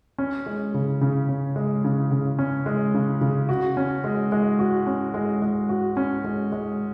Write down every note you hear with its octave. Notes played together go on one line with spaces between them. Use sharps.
C#4
G#3
C#3
C#3
C#4
G#3
C#3
C#3
C#4
G#3
C#3
C#3
F#4
C#4
G#3
G#3
F#4
C#4
G#3
G#3
F#4
C#4
G#3
G#3